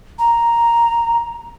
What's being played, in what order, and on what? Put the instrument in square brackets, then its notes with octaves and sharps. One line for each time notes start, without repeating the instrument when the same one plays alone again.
[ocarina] A#5